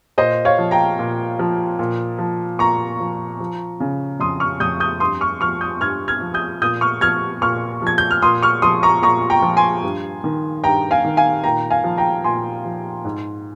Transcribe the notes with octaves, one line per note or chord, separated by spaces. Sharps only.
A#2 C5 D#5
C#5 F5
F3
G5 A#5
A#2
F3
A#2
F3
A#2 A#5 C#6
F3
F3
C#3
F2 C6 D#6
C#6 F6
F2 D#6 G6
D#6 G6
G2 C6 D#6
C#6 F6
F3 C#6 F6
D#6 G6
G2 F6 G#6
F6 G#6
F3
D#6 G6
A#2 D#6 G6
C#6 F6
F3 F6 G#6
A#2 C#6 F6
F3 G#6
G6
F6
A#2 C6 D#6
C#6 F6
F3 C6 D#6
A#5 C#6
A#2 A#5 C#6
G5 A#5
F3
G#5 C6
G2
D#3
G2 G5 A#5
F5 G#5
D#3
F5 G#5
A#2 G5 A#5
F5 G#5
F3
G5 A#5
A#2 G#5 C6
F3
G#2